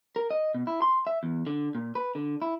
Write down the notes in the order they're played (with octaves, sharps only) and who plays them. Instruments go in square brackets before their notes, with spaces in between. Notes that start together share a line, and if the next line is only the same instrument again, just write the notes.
[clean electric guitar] A#4
D#5
B2
E4
C6
E5
E2
D3
A#2
B4
D3
E4